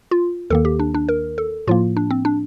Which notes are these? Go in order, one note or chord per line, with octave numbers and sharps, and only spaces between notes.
F4
D#2 D#3 A#3 A4
G4
D4
D4
A#4
A4
A2 F3 A#3 F4
D4
C4
D4